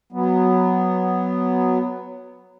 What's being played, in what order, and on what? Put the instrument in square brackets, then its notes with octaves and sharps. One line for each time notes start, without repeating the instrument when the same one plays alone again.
[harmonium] F#3 B3